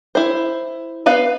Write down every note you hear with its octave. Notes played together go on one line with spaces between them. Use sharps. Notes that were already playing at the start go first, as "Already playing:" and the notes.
E4 C5
B3 B4 F5